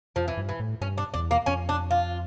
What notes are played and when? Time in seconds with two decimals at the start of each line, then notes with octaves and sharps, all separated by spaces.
0.16 F2 F3
0.28 E3
0.37 G2
0.49 E3
0.60 A2
0.81 G2 C#4
0.98 D4
1.14 E2 D4
1.31 A#3
1.46 F2 C#4
1.69 D4
1.91 F4